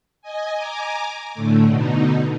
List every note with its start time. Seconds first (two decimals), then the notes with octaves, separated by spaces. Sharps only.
0.22 D#5 G#5
0.56 G#5 A#5 D6
1.34 A2 D3 A3
1.67 B2 D3 D#4